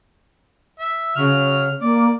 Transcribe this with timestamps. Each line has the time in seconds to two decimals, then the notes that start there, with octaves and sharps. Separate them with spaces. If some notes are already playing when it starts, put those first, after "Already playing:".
0.80 E5
1.16 C#3 F#3 F6
1.82 A#3 D5